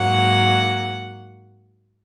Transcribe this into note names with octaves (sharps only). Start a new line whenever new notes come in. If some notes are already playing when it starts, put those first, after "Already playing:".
Already playing: G#2 F#3 A#3 F#5